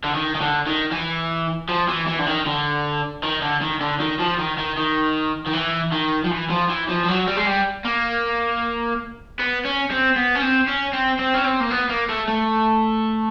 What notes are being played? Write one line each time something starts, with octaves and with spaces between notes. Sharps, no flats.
D3
D#3
D#3
D3
D#3
E3
F3
E3
E3
D3
D#3
D3
D#3
D3
D#3
D3
D#3
F3
D#3
D#3
D#3
D#3
E3
D#3
F3
E3
F3
E3
F3
F3
F#3
G3
G#3
G3
A#3
B3
C#4
C4
B3
C#4
C4
C#4
C4
C4
C#4
C4
A#3
B3
A#3
A3
A3